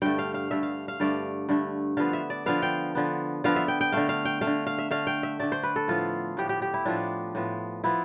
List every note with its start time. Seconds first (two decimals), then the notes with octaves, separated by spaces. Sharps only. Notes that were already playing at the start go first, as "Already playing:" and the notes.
0.02 G2 D3 A3 G5
0.19 F5
0.34 F5
0.51 G2 D3 A3 E5
0.63 F5
0.88 F5
1.00 G2 D3 A3 D5
1.49 G2 D3 A3
1.97 D3 F3 B3 F5
2.13 E5
2.30 D5
2.46 D3 F3 B3 F5
2.62 G5
2.95 D3 F3 B3
3.44 D3 F3 B3 F5
3.56 E5
3.68 G5
3.81 G5
3.92 D3 A3 F5
4.09 F5
4.25 G5
4.41 A3 F5
4.47 D3
4.67 F5
4.78 E5
4.91 D3 A3 F5
5.07 G5
5.23 E5
5.40 D3 A3 D5
5.52 C5
5.63 B4
5.76 A4
5.88 A2 F3 B3 F4
6.37 A2 F3 B3 G4
6.49 G4
6.62 G4
6.74 E4
6.85 A2 F3 B3 D4
7.35 A2 F3 B3
7.84 F3 B3 E4